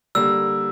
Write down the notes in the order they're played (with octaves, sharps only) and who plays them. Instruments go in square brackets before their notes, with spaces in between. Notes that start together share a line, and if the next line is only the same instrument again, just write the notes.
[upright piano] D3 G3 A#3 [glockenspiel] E6